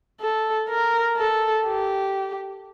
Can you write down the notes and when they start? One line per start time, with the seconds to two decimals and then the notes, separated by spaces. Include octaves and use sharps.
0.21 A4
0.69 A#4
1.18 A4
1.67 G4